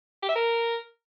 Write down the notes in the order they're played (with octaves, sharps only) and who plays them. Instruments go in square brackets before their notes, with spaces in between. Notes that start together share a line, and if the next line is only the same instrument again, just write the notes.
[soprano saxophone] G4
E5
A#4